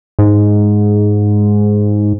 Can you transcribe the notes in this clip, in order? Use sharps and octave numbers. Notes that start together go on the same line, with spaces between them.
G#2